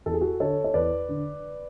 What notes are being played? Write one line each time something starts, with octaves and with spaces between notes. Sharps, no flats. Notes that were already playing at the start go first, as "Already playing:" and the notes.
E2 A4
G#4
F#4 A4
D3 A4 C#5
C#5
E2 B4 D5
D3